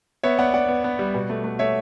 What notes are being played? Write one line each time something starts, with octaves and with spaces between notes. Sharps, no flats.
B3 C#5 E5
B3 D5 F#5
B3 D5 F#5
B3
B3
G3
B2
A3
A3
A3 C#5 E5